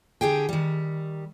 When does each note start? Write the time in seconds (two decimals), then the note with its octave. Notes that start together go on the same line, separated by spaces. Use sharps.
0.21 D3 G4 G#4 G5
0.49 D#3 G3